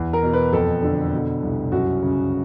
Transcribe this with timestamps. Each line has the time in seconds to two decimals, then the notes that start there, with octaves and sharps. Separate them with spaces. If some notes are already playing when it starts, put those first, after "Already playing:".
Already playing: E2
0.13 A#4
0.23 B2
0.33 B4
0.53 F2 A4
0.83 D3
1.12 B2
1.43 C2
1.72 F#2 F#4
2.03 C#3